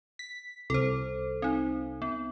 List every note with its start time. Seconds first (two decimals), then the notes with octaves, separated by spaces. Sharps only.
0.19 B6
0.70 C2 A4 C5
1.42 C4 D#4
2.02 B3